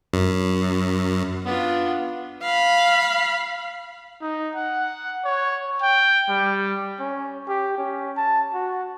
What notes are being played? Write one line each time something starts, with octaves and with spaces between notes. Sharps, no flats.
F#2
B3 D4 F4
F5 B5
D#4
F#5
C#5
G5
G3
C#4
G4
C#4
A5
F#4